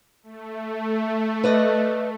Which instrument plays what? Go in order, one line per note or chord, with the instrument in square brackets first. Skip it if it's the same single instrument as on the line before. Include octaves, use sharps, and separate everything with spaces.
[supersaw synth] A3
[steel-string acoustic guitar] B4 D5 D#5